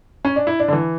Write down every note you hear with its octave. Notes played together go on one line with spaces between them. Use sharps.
C#4
D4
E4
D4
D3
E3